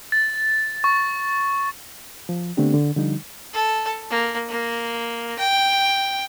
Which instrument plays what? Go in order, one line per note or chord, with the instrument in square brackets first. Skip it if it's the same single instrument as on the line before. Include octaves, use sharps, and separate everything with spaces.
[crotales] A6
C#6
[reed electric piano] F3
D3 A3 B3 C4 D4 G4
D3
D3 F3 G3 D#4
[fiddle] A4
A#3
A#3
G5